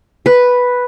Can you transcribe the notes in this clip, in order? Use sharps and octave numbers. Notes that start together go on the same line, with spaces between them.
B4